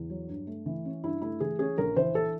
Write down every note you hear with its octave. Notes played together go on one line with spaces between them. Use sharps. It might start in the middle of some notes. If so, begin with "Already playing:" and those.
Already playing: E2
F#3
G2
A3
E3
C#4
G2 E4
A3 E4
E3 G#4
C#4 G#4
A#1 A#4
E3 C5
A4